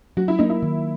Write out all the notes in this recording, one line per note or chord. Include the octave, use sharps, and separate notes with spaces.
F#3 F#4
E4
A#3 D#4
E4
D#3